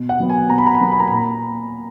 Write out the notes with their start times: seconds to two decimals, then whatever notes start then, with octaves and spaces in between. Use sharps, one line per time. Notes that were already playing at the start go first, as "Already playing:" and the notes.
Already playing: B2
0.09 F#5
0.20 F#3 B3
0.29 G#5
0.50 B2 A#5
0.58 B5
0.67 A#5
0.75 B5
0.81 F#3 B3 A#5
0.92 B5
1.00 A#5
1.08 A#2 B5
1.17 A#5